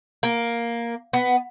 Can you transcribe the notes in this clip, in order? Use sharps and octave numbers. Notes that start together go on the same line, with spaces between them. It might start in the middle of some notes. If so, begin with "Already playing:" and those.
A#3
B3